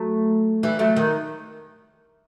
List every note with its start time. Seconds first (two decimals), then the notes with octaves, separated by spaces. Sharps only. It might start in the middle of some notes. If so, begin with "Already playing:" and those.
Already playing: F#3 A3
0.63 E3 G3
0.79 F#3 A3
0.96 D#3